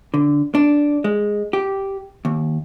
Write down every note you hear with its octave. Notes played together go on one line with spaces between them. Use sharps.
D3
D4
G#3
G4
D#2